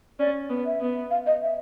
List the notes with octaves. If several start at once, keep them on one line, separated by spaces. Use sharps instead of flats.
C#4 D5
B3
E5
B3
F5
D#5
E5